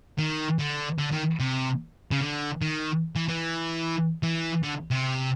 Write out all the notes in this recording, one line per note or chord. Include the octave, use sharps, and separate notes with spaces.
D#3
D3
D3
D#3
C3
C#3
D3
D#3
E3
E3
E3
D3
C3